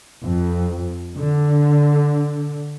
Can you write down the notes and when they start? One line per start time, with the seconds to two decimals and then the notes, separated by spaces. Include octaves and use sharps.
0.23 F2
1.16 D3